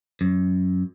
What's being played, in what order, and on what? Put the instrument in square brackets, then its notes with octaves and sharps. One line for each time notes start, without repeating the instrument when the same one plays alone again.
[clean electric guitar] F#2